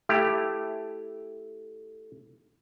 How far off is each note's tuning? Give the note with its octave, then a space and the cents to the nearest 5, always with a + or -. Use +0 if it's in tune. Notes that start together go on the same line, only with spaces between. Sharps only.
A3 +0 E4 +0 G4 +5